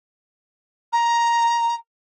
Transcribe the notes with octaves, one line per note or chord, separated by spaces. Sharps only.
A#5